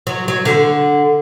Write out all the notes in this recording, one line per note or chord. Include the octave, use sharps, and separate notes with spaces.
F#3
F#3
D3